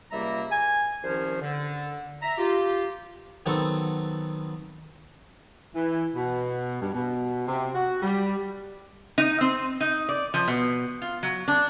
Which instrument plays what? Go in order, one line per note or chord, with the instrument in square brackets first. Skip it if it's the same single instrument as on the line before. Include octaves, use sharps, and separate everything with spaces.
[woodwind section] C#2 C3 G3 A#3 E5 A#5
G#5
C2 D#3 F3 C#4 C5
D3
E5 A#5
F4 G4
[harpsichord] D#3 F#3 B3 C4 F#4 A4
[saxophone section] E3
B2
G2
B2
C3
F#4
G3
[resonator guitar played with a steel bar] D#4
C4
D#4
D5
F3
B2
F4
F#3
D4